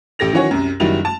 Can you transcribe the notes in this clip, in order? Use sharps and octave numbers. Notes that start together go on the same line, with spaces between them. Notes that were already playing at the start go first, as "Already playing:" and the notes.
A1 G4 A4 A#6 F7
D#3 E3 F#3 C#4 F#4 C#5
C2 F#2
F#1 D#3 F#3 G3 E4 F7
A5